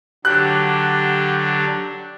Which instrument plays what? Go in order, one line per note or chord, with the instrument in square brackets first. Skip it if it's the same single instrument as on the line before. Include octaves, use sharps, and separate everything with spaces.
[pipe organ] D3 F#3 D4 [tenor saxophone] G4 [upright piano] F#6